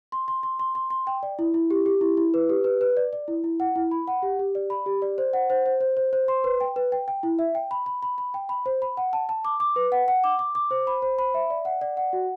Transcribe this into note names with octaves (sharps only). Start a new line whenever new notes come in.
C6
C6
C6
C6
C6
C6
G5
D5
E4
E4
G4
G4
E4
E4
B4
G4
B4
B4
D5
D5
E4
E4
F#5
E4
B5
F#5
G4
G4
D5
B5
G4
D5
C5
F#5
C5
C5
C5
C5
C5
C6
B4
G5
B4
G5
G5
E4
E5
G5
B5
B5
B5
B5
G5
B5
C5
B5
F#5
A5
A5
D6
D6
B4
F#5
F#5
D6
D6
D6
C5
B5
C5
B5
E5
D5
F#5
D5
F#5
F#4